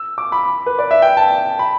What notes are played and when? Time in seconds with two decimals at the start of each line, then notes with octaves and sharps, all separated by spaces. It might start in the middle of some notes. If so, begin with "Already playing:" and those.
Already playing: E6
0.18 D6
0.32 B5
0.66 B4
0.79 D5
0.91 E5
1.02 G5
1.17 A5
1.59 B5